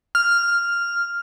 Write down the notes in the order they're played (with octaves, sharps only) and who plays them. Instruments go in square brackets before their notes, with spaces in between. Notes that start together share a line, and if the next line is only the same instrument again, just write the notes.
[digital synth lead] F6